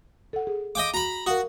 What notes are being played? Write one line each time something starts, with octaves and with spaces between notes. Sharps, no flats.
A4 F#5
G#4
D#5 F5 G5 D6
F#4 A#5 B5
F#4 A#4 F5 D#6